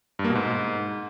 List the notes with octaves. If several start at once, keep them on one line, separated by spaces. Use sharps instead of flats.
G2
A#3
B2
G#2